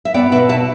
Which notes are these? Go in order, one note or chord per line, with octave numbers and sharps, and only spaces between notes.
E5
B3 D5 G5
B2 B4 E5
B2 E5 A5